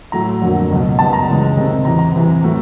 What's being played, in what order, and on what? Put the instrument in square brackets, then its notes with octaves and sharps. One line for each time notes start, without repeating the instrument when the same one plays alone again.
[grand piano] A2 F#3 A3 A#5
F2 D3 F#3 A#3
C#2 B2 F#3
F#2 D#3 G3 B3 A5
A#5
C#2 C#3 E3 G#3
C3 D#3 G3 C4
E2 C3 E3 A#5
A#5
E2 C3 E3
A2 F#3 A3